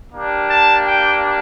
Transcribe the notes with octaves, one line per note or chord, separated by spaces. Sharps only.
A#3 D4 G4
A5
G5